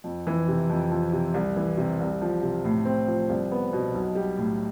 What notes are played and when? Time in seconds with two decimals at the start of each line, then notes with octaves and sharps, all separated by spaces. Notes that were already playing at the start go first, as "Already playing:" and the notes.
0.04 F2
0.27 E3
0.48 C3
0.69 F2
0.91 F3
1.13 C3
1.34 C2
1.56 E3
1.77 C3
2.00 C2
2.22 F3
2.42 C3
2.64 A2
2.85 C4
3.07 F3
3.29 C2
3.51 B3
3.73 B2
3.95 B1
4.15 G3
4.38 A2